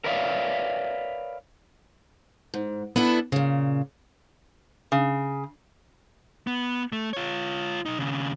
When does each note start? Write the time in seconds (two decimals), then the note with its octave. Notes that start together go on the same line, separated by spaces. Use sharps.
0.04 A#4 B4 C#5 D5 E5 F5
2.54 G#2
2.96 B3 D4 E4 A4
3.32 A#2 C#3
4.92 C#3
6.47 B3
6.92 A3
7.13 F4 C#5
7.86 B1 D#4
7.98 D#2 C#3